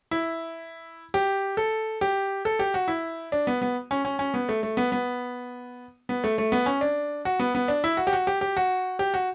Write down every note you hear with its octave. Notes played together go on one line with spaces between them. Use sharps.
E4
G4
A4
G4
A4
G4
F#4
E4
D4
B3
B3
C#4
C#4
C#4
B3
A3
A3
B3
B3
B3
A3
A3
B3
C#4
D4
F#4
B3
B3
D4
E4
F#4
G4
F#4
G4
G4
F#4
G4
F#4